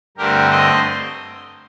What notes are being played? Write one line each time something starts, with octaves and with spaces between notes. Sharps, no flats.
G2 D3 A3 C4 G4 A#4
C5 D#5